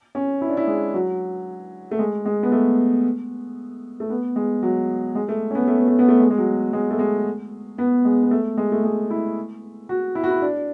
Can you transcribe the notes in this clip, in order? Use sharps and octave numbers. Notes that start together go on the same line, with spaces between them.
C#4
E4
D4
E4
G#3
F#3
A3
G#3
G#3
B3
A3
A3
B3
G#3
F#3
G#3
A3
C#4
B3
A3
B3
A3
B3
A3
G#3
G#3
F#3
G#3
A3
G#3
B3
G#3
B3
A3
G#3
A3
G#3
E4
F#4
E4
F#4
E4
D4